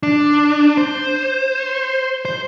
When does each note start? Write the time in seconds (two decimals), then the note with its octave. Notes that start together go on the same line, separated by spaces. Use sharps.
0.03 D4
0.77 C5
2.25 C5